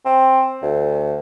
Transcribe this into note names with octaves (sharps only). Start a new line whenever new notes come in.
C4
D2